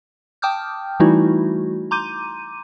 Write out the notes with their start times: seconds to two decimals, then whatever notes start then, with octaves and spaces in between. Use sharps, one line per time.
0.42 G5 A5 D6 D#6 F6 G6
1.00 E3 G3 A3 D#4 E4 F#4
1.91 A#5 C6 D6 G6 D#7